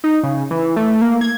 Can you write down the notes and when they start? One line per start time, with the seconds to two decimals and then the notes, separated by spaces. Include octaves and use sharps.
0.04 D#4
0.23 C#3
0.51 E3
0.76 A3
1.01 A#3
1.21 G#6